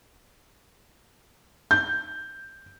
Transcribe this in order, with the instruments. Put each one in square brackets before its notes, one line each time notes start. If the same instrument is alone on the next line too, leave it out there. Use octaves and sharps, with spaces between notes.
[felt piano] G6